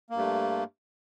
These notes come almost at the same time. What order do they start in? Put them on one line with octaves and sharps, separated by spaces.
A#3 G2 A3